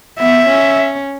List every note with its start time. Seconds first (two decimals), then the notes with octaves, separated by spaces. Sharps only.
0.19 B3 E5
0.47 C#4